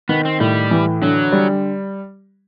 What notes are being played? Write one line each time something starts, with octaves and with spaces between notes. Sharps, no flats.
D#3 B3
C4
A2 G3
E3
D3 F#3
G3